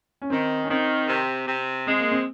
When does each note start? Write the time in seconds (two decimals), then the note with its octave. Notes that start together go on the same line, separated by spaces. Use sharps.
0.22 C#4
0.30 D#3 C4
0.64 C#4
0.68 D#3 C4
1.08 C3
1.47 C3
1.86 G#3 C4
1.99 A#3
2.12 C4